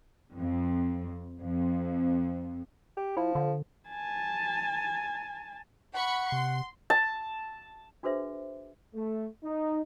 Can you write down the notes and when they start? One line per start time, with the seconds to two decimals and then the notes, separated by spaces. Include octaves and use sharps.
0.35 F2
1.42 F2
2.97 G4
3.17 F3 E4
3.35 D3
3.89 G#5 A5
5.95 F#5 B5 C#6
6.32 C3 C6
6.90 A5
8.03 D4 F#4 G#4 B4 C5 E5
8.94 A3
9.43 D#4